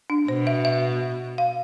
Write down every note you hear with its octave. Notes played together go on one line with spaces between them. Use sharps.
D4
B2 C5
E5
E5
F5